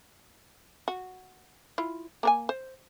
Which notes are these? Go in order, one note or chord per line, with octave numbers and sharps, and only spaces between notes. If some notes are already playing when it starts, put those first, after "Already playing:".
F#4
E4 F4
A#3 A#4 G#5
C5